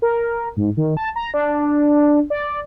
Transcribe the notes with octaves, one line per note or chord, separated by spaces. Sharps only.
A#4
G#2
D#3
A5
A#5
D4
D5